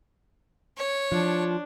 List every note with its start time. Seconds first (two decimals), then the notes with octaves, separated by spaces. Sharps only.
0.77 C#5
1.12 F3 D4